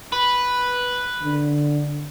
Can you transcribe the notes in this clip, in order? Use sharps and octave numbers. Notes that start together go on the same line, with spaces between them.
B4
D3